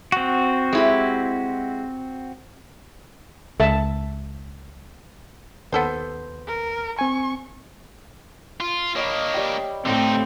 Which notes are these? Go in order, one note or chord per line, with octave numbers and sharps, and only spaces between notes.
C4 F#4
G#3 E4 G4
C#2 A4 E5 A5
D#2 B3 A4 C5
A#4
C4 G#5 C#6
F4
A#3 D4 C#5 D#5 B5
G3 G5
A2 D3 A3 C4 D#4 F5 G5